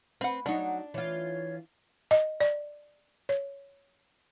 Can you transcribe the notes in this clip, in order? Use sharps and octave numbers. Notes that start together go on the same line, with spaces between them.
C4 B4 F#5
F#3 D4 D#4 C#5 F#5
E3 F4 C#5
D#5
D5
C#5